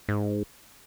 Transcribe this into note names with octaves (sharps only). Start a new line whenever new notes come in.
G#2